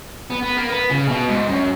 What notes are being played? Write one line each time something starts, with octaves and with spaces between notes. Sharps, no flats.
B3
B3
A#3
B3
C#3
B2
G#2
F#2